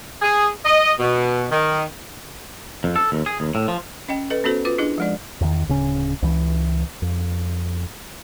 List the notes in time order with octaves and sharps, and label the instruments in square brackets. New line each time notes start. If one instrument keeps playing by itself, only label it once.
[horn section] G#4
D#5
B2
D#3
[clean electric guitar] F2
A4
D#2
G#4
D#2
A2
F3
[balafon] C#4 D#5 G5
A4 B4 D#5
B3 C#4 F#4 A4 C5
F4 B4 D6
D4 E4 G#4 D#5
F3 G#3 D5
[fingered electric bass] E2 D#3
D1 C#3 C#4
C#2 E3
F2